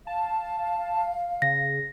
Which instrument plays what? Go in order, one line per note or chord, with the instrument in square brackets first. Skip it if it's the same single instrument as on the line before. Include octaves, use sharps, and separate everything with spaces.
[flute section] F5 [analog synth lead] A5
[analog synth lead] C#3 [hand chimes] A#6